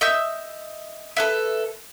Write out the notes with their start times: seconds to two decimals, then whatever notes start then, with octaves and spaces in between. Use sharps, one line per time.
0.01 D#5 E5 E6 G6
1.17 A4 B4 E5